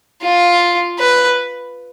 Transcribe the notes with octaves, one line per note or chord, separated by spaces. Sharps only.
F4
B4